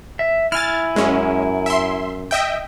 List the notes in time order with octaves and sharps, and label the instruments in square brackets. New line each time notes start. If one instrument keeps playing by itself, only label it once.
[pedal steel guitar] E5
[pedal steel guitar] E4 G#5 [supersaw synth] F6 A6
[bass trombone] F#2 [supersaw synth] G#3 C#4
[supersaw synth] E5 C6
D#5 E5 G5